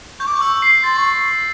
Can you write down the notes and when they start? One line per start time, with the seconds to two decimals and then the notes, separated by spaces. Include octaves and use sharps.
0.20 C#6 G6
0.26 D6
0.34 C#6
0.41 E6
0.62 C7
0.83 C6 A6
0.97 C#6